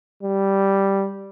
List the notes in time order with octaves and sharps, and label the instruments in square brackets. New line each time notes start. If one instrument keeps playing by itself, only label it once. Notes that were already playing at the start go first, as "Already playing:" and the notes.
[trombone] G3